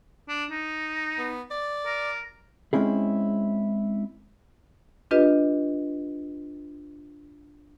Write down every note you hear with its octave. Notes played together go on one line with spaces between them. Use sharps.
D4
D#4
B3
D5
A#4
G#3 C4 C#4 E4 G#4
D4 F4 G4 B4 D#5